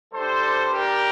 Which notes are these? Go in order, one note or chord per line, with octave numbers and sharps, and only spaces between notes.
G3 D4 G4 A4 C5
G4 A#4